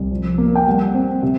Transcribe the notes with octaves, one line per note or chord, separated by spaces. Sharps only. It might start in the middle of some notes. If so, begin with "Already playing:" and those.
Already playing: C2
F3
A#3
G5
G3 F#5
C4
C3